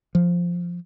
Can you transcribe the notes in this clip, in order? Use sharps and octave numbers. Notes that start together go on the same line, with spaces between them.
F3